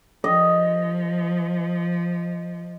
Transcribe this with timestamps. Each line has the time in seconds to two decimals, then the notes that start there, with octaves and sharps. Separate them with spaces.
0.24 F3 D#5